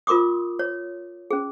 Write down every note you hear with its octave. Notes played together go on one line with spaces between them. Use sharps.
F4 A#4 C6 D6 D#6
C#5
C#4 G#4